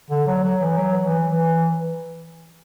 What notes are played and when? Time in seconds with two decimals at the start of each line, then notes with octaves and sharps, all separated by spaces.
0.10 D3
0.27 F#3
0.43 F#3
0.60 E3
0.77 F#3
1.03 E3
1.28 E3